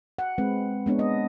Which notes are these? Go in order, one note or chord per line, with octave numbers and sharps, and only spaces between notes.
F#5
G#3 C4 B4
G#3 B3 D4 C#5
D#5